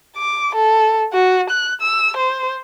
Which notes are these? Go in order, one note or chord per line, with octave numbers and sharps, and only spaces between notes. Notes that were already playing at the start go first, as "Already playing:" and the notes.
D6
A4
F#4
F#6
E6
C5